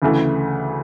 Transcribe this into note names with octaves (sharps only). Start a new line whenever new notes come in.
D2 C#3 E3 A3